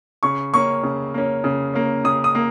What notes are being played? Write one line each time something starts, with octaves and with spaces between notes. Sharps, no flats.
C#3 C#6
A#3 C#4 C#6
C#3
A#3 C#4
C#3
A#3 C#4
C#3 D#6
D#6
A#3